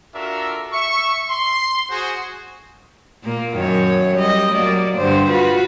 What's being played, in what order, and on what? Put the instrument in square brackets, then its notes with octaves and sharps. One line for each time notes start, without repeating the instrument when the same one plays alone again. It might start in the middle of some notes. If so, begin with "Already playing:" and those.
[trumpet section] D4 F4 F#4 A4 A#4 E5
E5 C#6
C6
F#4 G#4 C5
[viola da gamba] A#2 A#3
F#2 D#3 C#5
G3 D#5
F#3 A#3 D5
G2 D3 C5
F4 F#4 B4